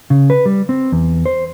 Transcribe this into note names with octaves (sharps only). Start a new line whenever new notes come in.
C#3
B4
G3
C4
E2
C5